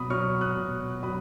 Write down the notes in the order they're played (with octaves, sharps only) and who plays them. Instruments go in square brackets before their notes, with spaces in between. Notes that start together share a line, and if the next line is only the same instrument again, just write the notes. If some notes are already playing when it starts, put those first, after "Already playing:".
Already playing: [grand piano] B2 F#3 B5 D#6
F#3 C#6 F6
D#6 F#6
B2
F#3 B5 D#6